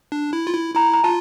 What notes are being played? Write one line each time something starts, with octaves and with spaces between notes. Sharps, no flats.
D4
E4
F4
E4
E4 A#5
A#5
F4 A5